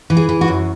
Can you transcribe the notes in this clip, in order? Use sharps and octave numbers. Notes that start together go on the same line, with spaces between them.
E3
G#4
E3
F#4
F#2